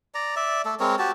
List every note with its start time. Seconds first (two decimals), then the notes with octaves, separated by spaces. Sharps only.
0.15 D5 A#5
0.36 D5 E5
0.65 A3 A4
0.80 G#3 C4 A#4 C#5
0.99 F#4 G4 A5